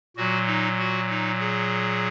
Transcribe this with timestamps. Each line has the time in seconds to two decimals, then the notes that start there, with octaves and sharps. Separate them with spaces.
0.16 A#2 F#3 F#4
0.47 D#4
0.79 F#4
1.10 D#4
1.40 G#4